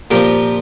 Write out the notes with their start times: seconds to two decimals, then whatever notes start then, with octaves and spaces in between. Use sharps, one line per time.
0.11 A#2 F3 C4 G4 A#4